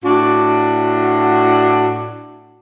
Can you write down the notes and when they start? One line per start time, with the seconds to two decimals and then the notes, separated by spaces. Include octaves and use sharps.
0.04 A2 D4 F#4